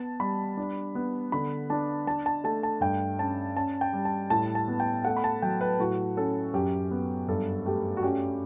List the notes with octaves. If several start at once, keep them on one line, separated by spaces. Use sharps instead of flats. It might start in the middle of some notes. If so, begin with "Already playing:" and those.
Already playing: B3 A5
G3 B5
D4
B3
D3 B5
D4 A5
D4 A5
A5
A3 A5
A5
G2 G5
C#4 A5
C#4 A5
G5
G3
A5
A2 A5
A5
B3
G5
A3 F#5
B5
A5
F#3 G5
B4
A2 F#4
C#4 A4
F#2 G4
B3
G2 A4
A3 G4
F#4
C#4 G4